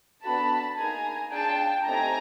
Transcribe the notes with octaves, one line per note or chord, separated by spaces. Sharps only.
B3 D4 F#4 A4 A5 B5
A#3 D#4 G#4 G#5 A#5
D4 F4 G#4 G5 A5
A3 C4 D#4 G4 G#5 A#5